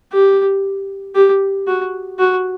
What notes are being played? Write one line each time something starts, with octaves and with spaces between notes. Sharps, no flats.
G4
G4
F#4
F#4